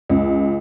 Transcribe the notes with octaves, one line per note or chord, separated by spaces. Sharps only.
C#2